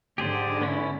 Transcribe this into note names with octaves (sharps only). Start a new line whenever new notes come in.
G#2 D3 G4 G#4 C5
B3 C#4 E4